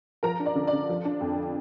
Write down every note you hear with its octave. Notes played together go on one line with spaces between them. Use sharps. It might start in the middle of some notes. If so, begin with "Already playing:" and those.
F3 A#4 A#5
D4
D5
D3
D5
D3
F3
D4
F2